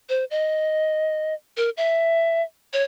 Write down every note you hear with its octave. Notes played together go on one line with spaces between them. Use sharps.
C5
D#5
A#4
E5
C#5